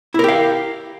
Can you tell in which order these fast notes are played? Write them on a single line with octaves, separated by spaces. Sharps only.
E4 A#4 G4 F5